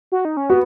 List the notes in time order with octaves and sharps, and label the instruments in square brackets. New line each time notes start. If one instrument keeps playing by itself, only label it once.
[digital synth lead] F#4
D#4
C#4
[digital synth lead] B3 [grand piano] F#4